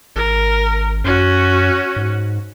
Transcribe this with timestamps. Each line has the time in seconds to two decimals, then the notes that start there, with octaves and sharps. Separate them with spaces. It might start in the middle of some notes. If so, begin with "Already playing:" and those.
0.16 G#1 A#4
1.04 F#2 C#4 F#4
1.96 G#2